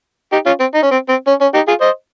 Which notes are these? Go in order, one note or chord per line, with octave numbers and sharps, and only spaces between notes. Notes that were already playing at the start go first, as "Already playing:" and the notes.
D#4 G4
C#4 F4
C4
D#4
C#4
C4
C4
C#4
C#4
D#4 G4
F4 G#4
C5 D#5